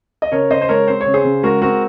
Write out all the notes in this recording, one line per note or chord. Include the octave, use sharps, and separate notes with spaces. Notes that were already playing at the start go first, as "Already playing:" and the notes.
D#5
C#3 A#4 C#5
C#3 C5 D#5
C5
G#3 A#4 C#5
C4 C5
C#5
C#3
G#4 C5
C#3
G#3 F#4 A#4
C4 F#4 A#4